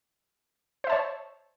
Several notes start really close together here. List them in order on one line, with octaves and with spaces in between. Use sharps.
C5 E5 A5 C#5